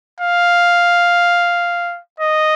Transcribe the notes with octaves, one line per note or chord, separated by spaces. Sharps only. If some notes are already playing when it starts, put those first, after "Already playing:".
F5
D#5